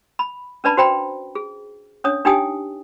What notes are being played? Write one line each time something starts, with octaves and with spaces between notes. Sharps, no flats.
B5
C#4 D4 B4 D5 A5 B5
F#4 C5 G5 A#5 B5
G#4
C#4 D4 C#5 D#6
D4 D#4 G4 G5 G#5 D#6